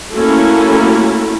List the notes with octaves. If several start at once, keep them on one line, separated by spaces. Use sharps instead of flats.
A3 A#3 C#4 E4 F#4 A4